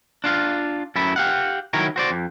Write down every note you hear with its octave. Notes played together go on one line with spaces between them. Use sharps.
D4 F4 F5
F#2 A3 E4 B5
G4 F5 F#5
D#3 F#3 E4 A#4 C#5
F#4 C5 D5
F2